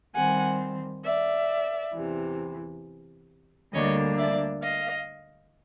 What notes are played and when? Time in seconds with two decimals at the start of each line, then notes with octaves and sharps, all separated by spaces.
0.15 D#3 G3 C4 F#5 G#5
1.05 D5 E5
1.94 E2 C3 E3
3.73 D2 D3 G3 A#3 D4 C#5 D#5
4.18 D5 E5
4.63 D#5 F5